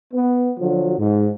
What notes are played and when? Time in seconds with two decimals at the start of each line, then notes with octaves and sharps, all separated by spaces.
0.14 B3
0.59 D3 F3 F#3
0.99 G#2